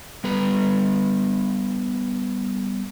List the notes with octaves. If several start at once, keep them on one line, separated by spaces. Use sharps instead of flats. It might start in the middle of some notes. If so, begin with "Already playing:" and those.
G3 B3 B4 A#5